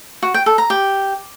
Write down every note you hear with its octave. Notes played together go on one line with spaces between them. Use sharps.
F#4
G5
A4
A#5
G4